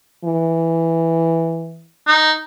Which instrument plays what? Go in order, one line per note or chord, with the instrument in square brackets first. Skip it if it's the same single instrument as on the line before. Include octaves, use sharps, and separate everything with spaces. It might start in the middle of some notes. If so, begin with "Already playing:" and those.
[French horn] E3
[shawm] D#4